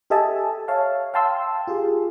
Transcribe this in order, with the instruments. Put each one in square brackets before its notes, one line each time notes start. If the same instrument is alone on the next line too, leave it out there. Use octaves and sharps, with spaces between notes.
[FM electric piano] G4 A4 D#5 E5 G#5 A5
C#5 E5 F5 A5
F5 G5 A5 C6 E6
F4 G4 G#4